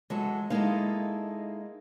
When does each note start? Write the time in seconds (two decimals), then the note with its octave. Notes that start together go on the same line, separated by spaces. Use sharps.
0.10 E3 F#3 G#3 A4
0.50 G#3 A#3 D#4 E4 A4 F5